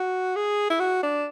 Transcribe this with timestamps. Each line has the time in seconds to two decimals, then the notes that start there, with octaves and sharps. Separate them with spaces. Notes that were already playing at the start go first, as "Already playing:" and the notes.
Already playing: F#4
0.36 G#4
0.70 E4
0.80 F#4
1.03 D4